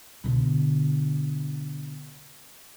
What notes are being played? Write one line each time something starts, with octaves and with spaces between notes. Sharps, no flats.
B2 D3